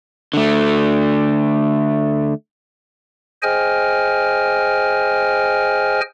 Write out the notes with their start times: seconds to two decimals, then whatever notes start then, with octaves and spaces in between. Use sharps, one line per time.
0.34 D3 A3
3.43 G#4 C5 D#5 G5 G#5 F6